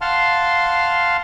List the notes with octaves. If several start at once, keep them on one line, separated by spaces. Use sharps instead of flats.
F5 F#5 A5 C6 F6